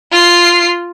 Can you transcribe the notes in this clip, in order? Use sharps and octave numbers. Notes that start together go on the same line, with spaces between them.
F4 C7